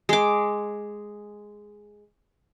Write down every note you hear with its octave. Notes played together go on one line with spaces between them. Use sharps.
G#3 D6